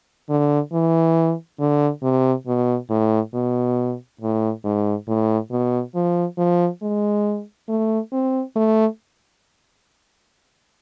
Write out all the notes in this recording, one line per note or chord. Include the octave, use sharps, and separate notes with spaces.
D3
E3
D3
C3
B2
A2
B2
A2
G#2
A2
B2
F3
F3
G#3
A3
C4
A3